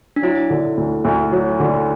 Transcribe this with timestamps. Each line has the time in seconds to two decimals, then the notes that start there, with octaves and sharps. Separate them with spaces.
0.16 D4
0.22 F#3 E4
0.50 D3
0.77 D2
1.05 D2
1.32 F#3
1.60 D3